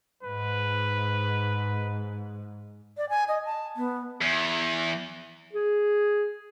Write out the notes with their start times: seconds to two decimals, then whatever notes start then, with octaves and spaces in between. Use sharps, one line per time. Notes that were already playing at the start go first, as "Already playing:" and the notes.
0.23 G#2 B4
2.97 D5
3.09 G#5
3.28 D#5
3.45 A5
3.76 B3
4.21 E2
5.53 G#4